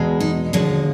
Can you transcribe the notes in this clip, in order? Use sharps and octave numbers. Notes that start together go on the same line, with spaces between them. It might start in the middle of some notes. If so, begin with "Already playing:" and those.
Already playing: E2 B2 G#3
D#4
D#2 D3 F3 G#3 F#4